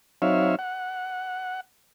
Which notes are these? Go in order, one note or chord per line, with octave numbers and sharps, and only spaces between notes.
F#3 C4 D#4 C#5 E5 F5
F#5